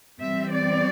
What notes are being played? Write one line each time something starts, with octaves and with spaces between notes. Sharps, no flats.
E3 G3 C4 E5
D5